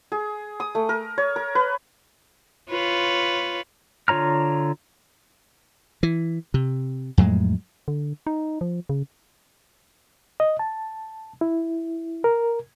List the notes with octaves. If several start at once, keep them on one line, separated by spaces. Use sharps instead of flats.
G#4
D#6
A3
A#4
C#5
A#4
B4
F4 B4 C#5
D3 F4 C#5 A#5 F6
E3
C3
F2 A2 F#3 G#3
D3
D#4
F3
C#3
D#5
A5
E4
A#4